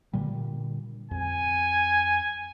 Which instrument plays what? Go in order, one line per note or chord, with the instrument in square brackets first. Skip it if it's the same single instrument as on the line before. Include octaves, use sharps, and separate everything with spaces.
[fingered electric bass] A#2 D3 G3
[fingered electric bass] F2 [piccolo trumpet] G#5